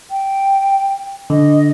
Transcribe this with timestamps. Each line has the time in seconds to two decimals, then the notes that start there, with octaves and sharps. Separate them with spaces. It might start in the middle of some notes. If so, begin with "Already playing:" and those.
0.10 G5
1.30 D3 D#5